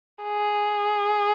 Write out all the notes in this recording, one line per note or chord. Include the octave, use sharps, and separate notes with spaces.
G#4